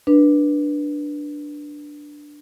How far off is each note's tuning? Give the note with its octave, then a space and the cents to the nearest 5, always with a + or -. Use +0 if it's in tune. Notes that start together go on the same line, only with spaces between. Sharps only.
D4 +0 B4 -20